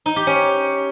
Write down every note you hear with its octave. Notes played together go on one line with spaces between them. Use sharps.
D#4
G4
C#4